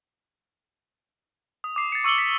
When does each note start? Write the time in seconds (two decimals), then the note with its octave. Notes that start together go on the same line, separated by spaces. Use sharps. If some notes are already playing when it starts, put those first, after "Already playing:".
1.64 D#6
1.76 D6 C7
1.92 A6 C7 C#7
2.04 C#6 E6 C#7 F#7 G7
2.18 B6